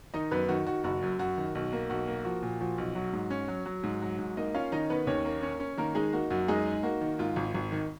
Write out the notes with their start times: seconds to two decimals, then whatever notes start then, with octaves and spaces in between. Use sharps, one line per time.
0.14 D#3 D#4 D#5
0.31 F#2 B3 B4
0.49 D#3 F#4
0.67 D#3 F#4
0.84 F#1 F#4
1.02 F#2
1.19 F#2 F#4
1.38 D#3
1.55 B1 F#4
1.73 A#3
1.90 B1 F#4
2.08 A#3
2.25 F3 F#4
2.42 A#2
2.60 F3 F#4
2.78 B1
2.95 F#3 F#4
3.13 G#2
3.30 C#4
3.48 F#3
3.66 F#3
3.83 G#2
4.02 F#3
4.19 G#2
4.37 A#3 D#4 D#5
4.54 C#4 F4 F5
4.72 D#3 D#4 D#5
4.90 D#3 B3 B4
5.07 D#2 C#4 C#5
5.25 A#3
5.42 C#4
5.60 C#4
5.77 D#3 A#3 A#4
5.95 G#3 D#4 G#4
6.13 A#3 F#4
6.30 F#2 F#4
6.48 G#3 D#4 G#4
6.66 D#4
6.83 A#3 F#4
7.01 D#3
7.19 G#2 F4
7.36 G#1
7.54 G#1
7.72 D#3